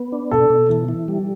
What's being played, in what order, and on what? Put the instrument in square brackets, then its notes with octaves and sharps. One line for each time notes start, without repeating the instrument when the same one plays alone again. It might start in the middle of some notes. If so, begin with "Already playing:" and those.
Already playing: [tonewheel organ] B3
D4
[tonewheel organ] B2 [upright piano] A4
[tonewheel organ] B2
E3
E3
G3